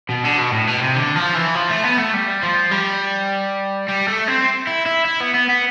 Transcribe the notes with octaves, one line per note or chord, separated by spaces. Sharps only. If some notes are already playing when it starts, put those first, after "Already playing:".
B2
D3
B2
A2
B2
C3
D3
F3
E3
F3
A3
B3
A3
G3
F3
G3
G3
A3
C4
E4
E4
E4
B3
B3
B3